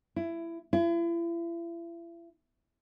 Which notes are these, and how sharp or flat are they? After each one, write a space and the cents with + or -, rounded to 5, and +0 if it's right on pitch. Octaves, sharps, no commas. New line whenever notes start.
E4 +20
E4 +40